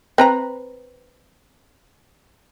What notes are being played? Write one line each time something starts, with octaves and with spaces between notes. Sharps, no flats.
C4 B4 A#5